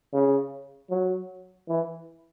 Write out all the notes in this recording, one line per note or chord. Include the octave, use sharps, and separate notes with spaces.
C#3
F#3
E3